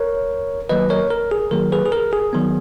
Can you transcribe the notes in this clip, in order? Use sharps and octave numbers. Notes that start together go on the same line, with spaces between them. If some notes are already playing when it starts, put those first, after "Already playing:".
Already playing: A#4 C#5
D#3 F#3 A#3 B4 D#5
A#4 C#5
A#4
G#4
D#3 F#3 A#3 A#4
G#4 B4
G#4
A#4
G#4
D#3 F#3 B3